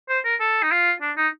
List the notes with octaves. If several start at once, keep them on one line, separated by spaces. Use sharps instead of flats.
C5
A#4
A4
D#4
F4
D4
D#4